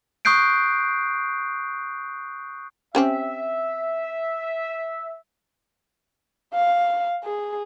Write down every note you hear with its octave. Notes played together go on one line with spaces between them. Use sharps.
C#6 D#6 F#6 G6 C7 D7
C4 C#4 G4 E5
F5
G#4